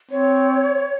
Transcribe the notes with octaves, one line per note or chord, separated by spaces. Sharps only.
C4 C#5